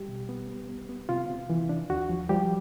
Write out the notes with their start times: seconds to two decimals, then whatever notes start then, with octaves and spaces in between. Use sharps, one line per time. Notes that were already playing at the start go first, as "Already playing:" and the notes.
Already playing: G3 G4
0.08 B2
0.29 B3
0.49 B3
0.69 B3
0.89 B3
1.09 C3 F4
1.29 C3
1.50 E3
1.69 D4
1.90 D#2 F#4
2.09 F3
2.29 F3 G3 G4